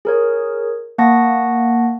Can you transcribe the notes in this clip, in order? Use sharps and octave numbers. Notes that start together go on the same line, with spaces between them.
G#4 A#4 C#5
A#3 F#5 A5 C#6 A#6